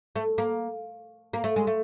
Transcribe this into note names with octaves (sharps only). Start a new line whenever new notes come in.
A3
A#3
A#3
A3
G#3
A3